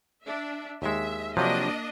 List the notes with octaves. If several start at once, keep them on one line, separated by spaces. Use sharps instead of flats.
D4 E5
D#2 G#3 E5
C3 F3 F#3 A#3 D4 D#5